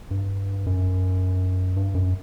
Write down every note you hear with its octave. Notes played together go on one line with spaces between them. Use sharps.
G2
F#2
G2
F#2